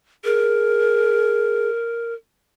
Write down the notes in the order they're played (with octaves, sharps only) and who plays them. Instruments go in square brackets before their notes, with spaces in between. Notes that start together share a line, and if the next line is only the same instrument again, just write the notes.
[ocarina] G#4 [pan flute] A#4